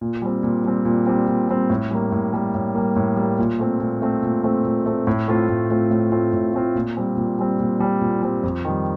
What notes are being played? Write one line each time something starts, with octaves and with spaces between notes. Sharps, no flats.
A#2
G3 C4
A#2
G3 C4
A#2
G3 C4
A#2
G3 C4
A2
G3 A#3
A2
G3 A#3
A2
G3 A#3
A2
G3 A#3
A#2
A3 C4
A#2
A3 C4
A#2
A3 C4
A#2
A3 C4
A2
A3 C4 F4
A2
A3 C4 F4
A2
A3 C4 F4
A2
A3 C4 F4
A#2
G3 C4
A#2
G3 C4
A#2
G3 C4
A#2
G3 C4
F2
D#3 G3